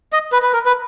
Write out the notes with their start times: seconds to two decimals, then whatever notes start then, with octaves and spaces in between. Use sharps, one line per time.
0.13 D#5
0.32 B4
0.42 B4
0.53 A#4
0.66 B4